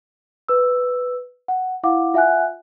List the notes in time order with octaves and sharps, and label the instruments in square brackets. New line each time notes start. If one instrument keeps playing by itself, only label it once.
[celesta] B4 E6
F#5
E4 F5 F#5 D6
F4 E5 F#5 G#5 F#6